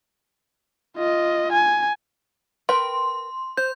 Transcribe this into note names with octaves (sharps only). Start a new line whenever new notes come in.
F4 D#5
G#5
A#4 B4 G5 C6
C5 G6